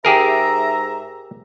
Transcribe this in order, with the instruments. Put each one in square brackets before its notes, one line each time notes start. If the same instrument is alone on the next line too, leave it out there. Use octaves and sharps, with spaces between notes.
[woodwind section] G#2 E5 A#5 [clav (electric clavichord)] G4 G#4 A#4